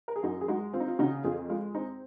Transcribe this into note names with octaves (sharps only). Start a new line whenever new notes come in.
A#4
G#4
F#2 D#4 F#4
G#4
G#3 D#4 F#4
C4 F4
D#4
F4
C#3 D#4 F#4
F2 F4 G#4
G#3 F4
C4 D#4